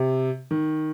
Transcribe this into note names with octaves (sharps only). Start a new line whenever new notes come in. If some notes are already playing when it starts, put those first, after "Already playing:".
Already playing: C3
D#3